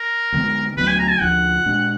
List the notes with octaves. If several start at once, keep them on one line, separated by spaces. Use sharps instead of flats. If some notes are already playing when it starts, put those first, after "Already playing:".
Already playing: A#4
D2 D3 G#3 B3
D2 D3 F#3 B3 B4
G#5
A#5
G#5
D2 D3 F3 F#5
A#2 G#3 D4